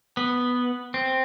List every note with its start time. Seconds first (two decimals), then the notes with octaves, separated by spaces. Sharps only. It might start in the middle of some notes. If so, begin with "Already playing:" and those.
0.17 B3
0.94 C4